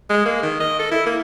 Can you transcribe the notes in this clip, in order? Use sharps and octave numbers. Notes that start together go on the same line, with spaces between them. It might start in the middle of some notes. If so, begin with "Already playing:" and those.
G#3
A#3
D#3
D#5
A4
E4
A#3